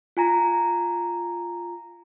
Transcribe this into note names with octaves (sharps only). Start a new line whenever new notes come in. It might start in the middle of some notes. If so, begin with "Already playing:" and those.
F4 G#5 A#5